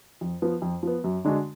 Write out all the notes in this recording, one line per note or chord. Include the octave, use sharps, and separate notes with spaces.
F2
F3 B3
F2
F3 B3
F#2
D3 G#3 D4 F#4